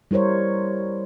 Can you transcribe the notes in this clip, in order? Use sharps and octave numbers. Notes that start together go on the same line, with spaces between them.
G3 E4 A#4 C5 C#5